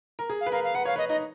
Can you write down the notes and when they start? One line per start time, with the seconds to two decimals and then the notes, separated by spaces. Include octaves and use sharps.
0.19 A#4
0.30 G#4
0.41 F5
0.46 B4
0.52 A#4 F5
0.64 F5
0.75 B4 F#5
0.85 C#5 F5
0.96 B4 D#5
1.09 D#4 D#5